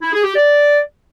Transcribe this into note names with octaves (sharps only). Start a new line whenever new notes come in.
E4
G#4
G4
D5